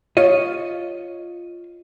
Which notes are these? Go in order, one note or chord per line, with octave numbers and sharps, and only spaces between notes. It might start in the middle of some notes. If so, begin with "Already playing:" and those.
F4 C#5 D#5